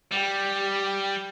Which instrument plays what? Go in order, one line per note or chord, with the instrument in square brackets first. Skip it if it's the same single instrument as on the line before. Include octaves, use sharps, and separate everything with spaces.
[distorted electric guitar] G3 [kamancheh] G4